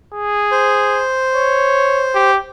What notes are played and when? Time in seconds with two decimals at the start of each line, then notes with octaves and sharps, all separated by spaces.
0.14 G#4
0.51 C5
1.36 C#5
2.15 G4